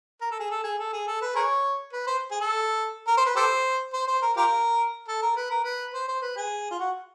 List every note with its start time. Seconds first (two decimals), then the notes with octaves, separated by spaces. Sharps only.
0.21 A#4
0.31 A4
0.40 G#4
0.50 A4
0.64 G#4
0.78 A4
0.93 G#4
1.07 A4
1.21 B4
1.35 G#4 A#4 C#5
1.93 B4
2.07 C5
2.31 G#4
2.41 A4
3.07 A#4
3.17 C5
3.26 B4
3.36 G4 A4 C5
3.93 C5
4.08 C5
4.22 A#4
4.37 F4 G4 A#4
5.08 A4
5.22 A#4
5.36 B4
5.50 A#4
5.64 B4
5.93 C5
6.08 C5
6.22 B4
6.36 G#4
6.71 F4
6.80 F#4